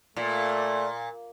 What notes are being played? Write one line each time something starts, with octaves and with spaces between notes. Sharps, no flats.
A#2 A3 D5